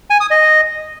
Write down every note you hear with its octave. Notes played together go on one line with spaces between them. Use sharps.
G#5
D#6
D#5